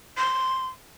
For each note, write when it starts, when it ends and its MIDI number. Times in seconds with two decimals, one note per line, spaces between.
0.17 0.67 84